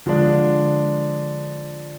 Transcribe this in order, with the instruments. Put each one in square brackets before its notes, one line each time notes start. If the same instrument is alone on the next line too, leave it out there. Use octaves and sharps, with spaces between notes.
[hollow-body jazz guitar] D3 [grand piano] F3 G#3 D4